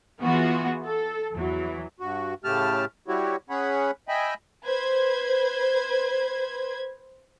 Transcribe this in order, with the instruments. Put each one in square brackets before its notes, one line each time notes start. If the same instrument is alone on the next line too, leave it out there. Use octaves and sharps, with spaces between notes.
[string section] E3 B3 F4 F#4 G#4
A4
E2 E3 F#3
[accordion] G2 F#4
A2 C#3 A3 G4 A5 F6
G3 E4 F#4 G4 C#5
C#4 G#4 C#5 F#5 B5
D#5 E5 G5 G#5 B5
[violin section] B4 C5 G#6